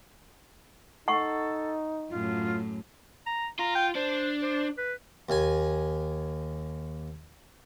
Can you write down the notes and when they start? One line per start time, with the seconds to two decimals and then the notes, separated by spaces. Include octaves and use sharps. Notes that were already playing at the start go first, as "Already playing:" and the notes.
1.08 D#4 A4 F#5 C#6
2.10 F#2 A2 F4
3.26 A#5
3.59 F4 A#5
3.75 G5
3.96 D4 C5
4.42 C5
4.78 B4
5.29 D#2 G#5